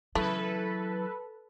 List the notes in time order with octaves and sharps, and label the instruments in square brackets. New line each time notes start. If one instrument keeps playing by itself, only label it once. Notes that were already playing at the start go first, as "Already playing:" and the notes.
[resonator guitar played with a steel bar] C#3 E3 E4 [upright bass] F#3 [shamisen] A3 [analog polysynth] A4 B4